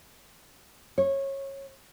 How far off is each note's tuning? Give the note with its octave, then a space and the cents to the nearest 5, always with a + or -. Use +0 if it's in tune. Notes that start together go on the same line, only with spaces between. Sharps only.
C#5 -20